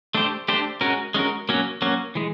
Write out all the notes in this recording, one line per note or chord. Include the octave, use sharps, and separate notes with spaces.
A3 D4 G4 C5
A3 D4 G4 C5
G#3 C#4 F#4 A#4
G#3 C#4 F#4 A#4
F#3 A#3 C#4 F#4
F#3 A#3 C#4 F#4
E3 G#3